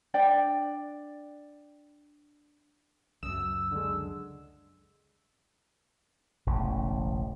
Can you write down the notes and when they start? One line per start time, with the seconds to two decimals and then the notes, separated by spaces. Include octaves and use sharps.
0.14 D4 D5 G5
3.23 C#2 F#2 D#6 E6
3.71 D3 G#3
6.46 E1 A1 C#3